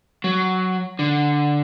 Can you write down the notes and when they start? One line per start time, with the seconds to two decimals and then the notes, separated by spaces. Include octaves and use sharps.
0.24 F#3
0.99 D3